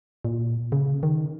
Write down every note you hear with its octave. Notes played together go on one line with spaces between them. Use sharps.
A#2
C#3
D#3